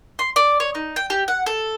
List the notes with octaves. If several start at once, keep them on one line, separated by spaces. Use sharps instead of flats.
C6
D5
C#5
D#4
G5
G4
F#5
A4